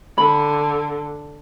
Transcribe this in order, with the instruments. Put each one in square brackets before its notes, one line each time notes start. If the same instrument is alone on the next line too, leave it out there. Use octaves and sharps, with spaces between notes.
[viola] D3 [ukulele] B5